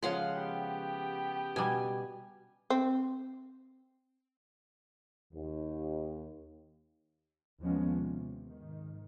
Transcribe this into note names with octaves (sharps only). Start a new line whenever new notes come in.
C#3 F3 G#3 F5 F#5 C6
B3 G4
B2 G3 G#5
C4
D#2
D#2 F3 G#3 B3 C#4
C3
G#2 D#3